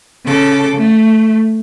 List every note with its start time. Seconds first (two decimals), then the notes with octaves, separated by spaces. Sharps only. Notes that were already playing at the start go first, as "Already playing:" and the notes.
0.25 C#3 A4 D6
0.76 A3